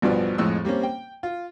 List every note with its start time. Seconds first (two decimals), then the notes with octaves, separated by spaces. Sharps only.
0.02 A1 G2 B2 F3 B3 D5
0.38 F2 A2 G#3 E6
0.65 G3 A#3 C4 C#4
0.83 G5
1.23 F4